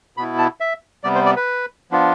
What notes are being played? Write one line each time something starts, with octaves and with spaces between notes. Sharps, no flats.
B2 B3 E4 B5
A5
E5
C3 G3 B3 D5
C5
D5
B4
F3 B3 D4 F4